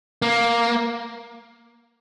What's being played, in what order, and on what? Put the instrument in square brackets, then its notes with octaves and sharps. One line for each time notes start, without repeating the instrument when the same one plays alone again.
[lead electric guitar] A#3